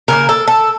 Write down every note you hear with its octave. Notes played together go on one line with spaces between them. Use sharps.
C#3 F#3 A#3 A#4
A4
A4